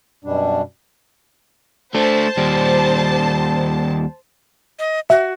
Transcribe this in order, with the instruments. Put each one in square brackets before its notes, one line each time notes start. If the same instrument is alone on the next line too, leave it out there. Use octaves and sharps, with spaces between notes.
[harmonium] F#2 B2 G3 D4
[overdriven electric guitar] A3 D4 [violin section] C5 A5
[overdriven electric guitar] D#2 G3
[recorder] D#5
[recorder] F#4 [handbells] E5